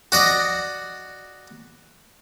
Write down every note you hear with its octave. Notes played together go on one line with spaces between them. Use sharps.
F#4 D5 D#5